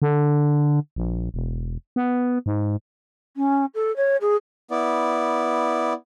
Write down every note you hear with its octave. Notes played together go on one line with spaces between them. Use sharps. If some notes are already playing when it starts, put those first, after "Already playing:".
D3
A#1
E1
B3
G#2
C#4
A4
C#5
G#4
B3 E4 D5